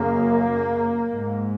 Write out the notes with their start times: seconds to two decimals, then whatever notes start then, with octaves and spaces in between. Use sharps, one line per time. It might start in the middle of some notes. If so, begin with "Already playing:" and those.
Already playing: F#2 C#3 A#3
1.11 G#2